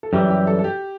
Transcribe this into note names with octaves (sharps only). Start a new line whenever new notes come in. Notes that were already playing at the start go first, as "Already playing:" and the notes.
A4
F#2 E3 G3 G4
G4
A4
A4
G4